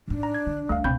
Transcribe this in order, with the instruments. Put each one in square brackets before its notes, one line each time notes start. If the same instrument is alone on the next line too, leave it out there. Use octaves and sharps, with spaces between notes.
[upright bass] A2 D#4 [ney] D4
[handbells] A#5
G#6
[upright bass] D3
[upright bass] D2 G3 [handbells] A3 F5
[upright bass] C#2 B2 [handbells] C4 B5 G6